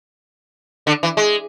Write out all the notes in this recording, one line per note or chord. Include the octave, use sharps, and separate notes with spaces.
D3
E3
G#3